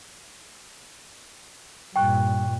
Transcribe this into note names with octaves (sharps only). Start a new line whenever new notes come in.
G2 A#2 G5 C#6 F#6